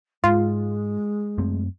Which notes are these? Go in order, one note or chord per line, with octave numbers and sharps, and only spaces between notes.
G#2 G#3 F4
F#2 A3 C4